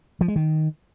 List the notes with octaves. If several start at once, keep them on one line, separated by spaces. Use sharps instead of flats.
F3
G#3
D#3